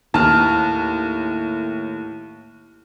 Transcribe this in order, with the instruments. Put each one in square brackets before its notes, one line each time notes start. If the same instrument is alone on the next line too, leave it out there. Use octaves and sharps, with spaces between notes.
[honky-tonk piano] D#2 [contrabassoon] A2 [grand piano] A5 F6